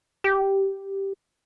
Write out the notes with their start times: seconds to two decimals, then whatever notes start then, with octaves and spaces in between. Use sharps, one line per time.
0.24 G4